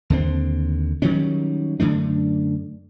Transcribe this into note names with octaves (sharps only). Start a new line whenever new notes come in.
D#2 D3 C4
D#3 F#3 G3 C#4
F#2 D3 A3 D4